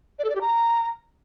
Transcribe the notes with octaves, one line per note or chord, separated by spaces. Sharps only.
D5
A4
D5
G4
A#5